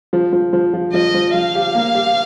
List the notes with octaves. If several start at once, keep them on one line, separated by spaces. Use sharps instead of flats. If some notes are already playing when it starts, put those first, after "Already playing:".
F3
F3
F3
F3
F3 D#5
F3
F3 F5
G4
A#3
G4